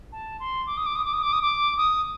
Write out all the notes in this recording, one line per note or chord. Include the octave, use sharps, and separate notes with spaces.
A5
C6
D6
D#6
D6
D#6
D6
D#6
D6
D#6
D6
D#6